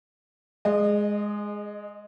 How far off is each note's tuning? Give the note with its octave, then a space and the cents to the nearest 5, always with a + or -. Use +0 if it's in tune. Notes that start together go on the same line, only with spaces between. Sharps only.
G#3 +0 D#5 -30